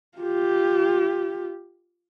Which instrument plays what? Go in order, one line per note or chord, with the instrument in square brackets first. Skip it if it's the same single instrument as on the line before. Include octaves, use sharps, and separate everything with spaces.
[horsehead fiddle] F4 G4